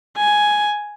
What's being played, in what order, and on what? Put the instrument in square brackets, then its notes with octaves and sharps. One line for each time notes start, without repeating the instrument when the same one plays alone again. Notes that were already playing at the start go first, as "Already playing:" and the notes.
[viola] G#5